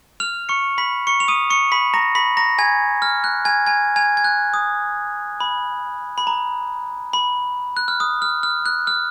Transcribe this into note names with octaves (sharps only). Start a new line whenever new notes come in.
F6 F7
C#6 C#7
B5 B6
C#6 C#7
F7
D#6 D#7
C#6 C#7
B5 B6
A#5 A#6
B5 B6
A#5 A#6
G#5 G#6
F6
F#6
G#5 G#6
G#5 G#6
G#5 G#6
G#6
F#6
D#6
B5
B5
A#5
B5
F#6
F6
D#6
F6
F6
F#6
F6